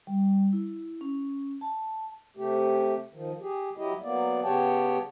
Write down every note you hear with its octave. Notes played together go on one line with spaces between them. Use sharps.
G3
E4
C#4
A5
C3 A3 G4
D#3 F3
G4 G#4
F#3 E4 G4 D#5
F#3 A#3 B3 D5
C#3 B3 G4 C#5 G5 A5